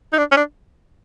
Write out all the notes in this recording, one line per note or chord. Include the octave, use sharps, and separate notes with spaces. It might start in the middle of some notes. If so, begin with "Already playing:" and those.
D#4
D4
C#4
D4